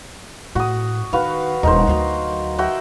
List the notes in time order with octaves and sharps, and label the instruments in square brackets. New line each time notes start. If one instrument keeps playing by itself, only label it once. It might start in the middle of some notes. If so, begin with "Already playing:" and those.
[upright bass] A2 [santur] F#4 D#6
[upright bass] D#3 [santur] F#4 B4 F5
[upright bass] D#1 [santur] D#4 A#4 C5
[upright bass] D2 F#3
[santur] F#4 E5 G5